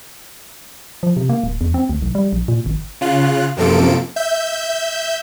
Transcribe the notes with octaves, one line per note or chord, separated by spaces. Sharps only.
F3
C3
A#3
D1
E2
C4
D2
B1
G3
A#1
A#2
G#1
C#3 F4 F#6
F#2 C3 F3 A#3 A4 D7
E5 G6